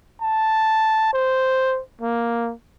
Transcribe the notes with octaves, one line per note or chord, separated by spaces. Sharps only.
A5
C5
A#3